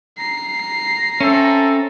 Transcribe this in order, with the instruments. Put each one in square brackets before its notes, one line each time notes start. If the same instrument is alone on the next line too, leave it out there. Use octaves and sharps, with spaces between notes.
[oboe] A#5 [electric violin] C7
[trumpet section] C4 A4 E5 [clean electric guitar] C#4